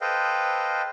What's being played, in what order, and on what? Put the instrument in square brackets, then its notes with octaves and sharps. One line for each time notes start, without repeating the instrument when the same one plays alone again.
[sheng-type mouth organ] A4 B4 C5 D#5 F5 G5